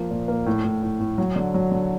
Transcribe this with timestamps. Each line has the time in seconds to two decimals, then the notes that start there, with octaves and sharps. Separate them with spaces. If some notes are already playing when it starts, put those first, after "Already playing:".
Already playing: F3 A#3
0.11 A#2
0.28 A#3
0.46 A2
0.64 A2
0.83 A2
1.00 A2
1.18 F#3
1.36 D3
1.54 F#3
1.71 D3